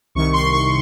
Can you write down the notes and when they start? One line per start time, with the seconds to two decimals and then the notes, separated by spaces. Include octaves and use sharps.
0.15 C2 C3 D#3 C#6
0.33 C6
0.53 C#6